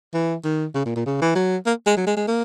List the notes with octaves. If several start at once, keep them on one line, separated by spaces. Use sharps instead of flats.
E3
D#3
C#3
A#2
A#2
C#3
E3
F#3
A#3
G#3
F#3
G#3
G#3
A#3